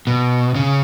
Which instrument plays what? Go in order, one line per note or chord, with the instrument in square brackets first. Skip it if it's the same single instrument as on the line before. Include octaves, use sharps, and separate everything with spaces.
[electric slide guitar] B2
C#3